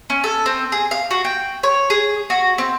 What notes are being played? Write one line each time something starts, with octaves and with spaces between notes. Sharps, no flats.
C#4
A4
C4
G#4
F5
F#4
G5
C#5
G#4
F#4
C4